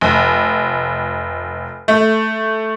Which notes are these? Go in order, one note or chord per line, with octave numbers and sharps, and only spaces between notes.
F1
A3